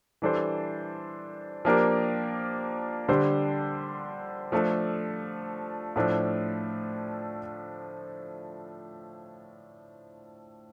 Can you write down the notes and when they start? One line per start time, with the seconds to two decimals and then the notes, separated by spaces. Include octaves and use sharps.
0.22 E3 G3 D4 A4 C5
1.65 F3 A#3 D4 G4 A#4
3.09 D3 G3 D4 G4 C5
4.52 F3 A3 D4 A4
5.96 A2 F3 A3 D4